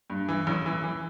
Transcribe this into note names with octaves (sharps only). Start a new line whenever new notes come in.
G2
E3
A1
E3
E3